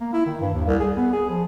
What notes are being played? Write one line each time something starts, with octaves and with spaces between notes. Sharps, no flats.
A#3
E4
D#3
G2
D#2
C2
G#4
B3
G#4
F3